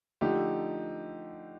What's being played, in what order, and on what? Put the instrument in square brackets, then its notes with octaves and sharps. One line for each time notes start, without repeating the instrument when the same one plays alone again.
[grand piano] D3 F3 A3 D#4 G4